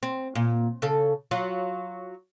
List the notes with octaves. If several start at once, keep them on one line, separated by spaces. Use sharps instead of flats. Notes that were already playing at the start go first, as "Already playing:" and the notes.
C4
A#2
C#3 A4
F#3 F4